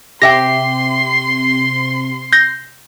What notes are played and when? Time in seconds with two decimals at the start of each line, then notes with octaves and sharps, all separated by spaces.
0.22 C3 G4 E5 G5 C6 A#6 C7
2.33 G6 A#6